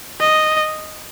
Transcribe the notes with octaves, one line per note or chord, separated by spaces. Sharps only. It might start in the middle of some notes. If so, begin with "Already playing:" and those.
D#5